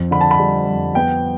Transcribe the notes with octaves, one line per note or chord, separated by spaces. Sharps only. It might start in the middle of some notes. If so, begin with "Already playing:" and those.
Already playing: F2
D3 B5
A5
B5
G3
F2
B3 G5